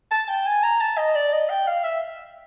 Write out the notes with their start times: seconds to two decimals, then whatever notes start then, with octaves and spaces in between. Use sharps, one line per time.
0.11 A5
0.28 G5
0.46 G#5
0.63 A#5
0.80 A5
0.98 D#5
1.15 D5
1.32 D#5
1.50 G5
1.67 F5
1.84 E5